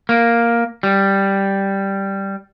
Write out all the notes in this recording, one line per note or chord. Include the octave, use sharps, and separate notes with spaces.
A#3
G3